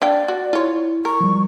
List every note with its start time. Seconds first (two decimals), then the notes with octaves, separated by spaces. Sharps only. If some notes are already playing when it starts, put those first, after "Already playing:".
0.02 D4 D5 F5 G5
0.28 F#4
0.53 E4 F4 C#5
1.05 A#4 C#6
1.21 F3 G3